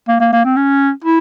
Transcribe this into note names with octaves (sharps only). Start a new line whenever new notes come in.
A#3
A#3
A#3
C4
C#4
E4